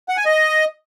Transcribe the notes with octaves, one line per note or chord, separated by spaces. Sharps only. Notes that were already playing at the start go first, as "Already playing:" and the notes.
F#5
G#5
D#5